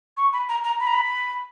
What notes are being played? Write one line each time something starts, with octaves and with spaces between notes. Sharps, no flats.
C#6
B5
A#5
A#5
B5
A#5
B5